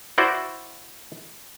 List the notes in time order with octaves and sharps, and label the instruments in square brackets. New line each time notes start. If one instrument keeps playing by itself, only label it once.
[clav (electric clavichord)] E4 F#4 C5 D5